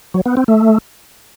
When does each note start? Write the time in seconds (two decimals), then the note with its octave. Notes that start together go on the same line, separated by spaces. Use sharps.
0.14 F#3
0.26 B3
0.37 C4
0.48 A3